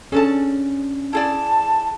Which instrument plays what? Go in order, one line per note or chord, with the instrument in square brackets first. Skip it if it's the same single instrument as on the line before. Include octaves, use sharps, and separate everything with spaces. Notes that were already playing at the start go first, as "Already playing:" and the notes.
[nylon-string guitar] C#4 D4 [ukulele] G#4 A4 A5
[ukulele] E4 G#4 D5 [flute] A5